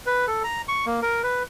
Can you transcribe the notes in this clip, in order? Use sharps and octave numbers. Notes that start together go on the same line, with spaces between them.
B4
A4
A#5
C#6
A#3
A#4
B4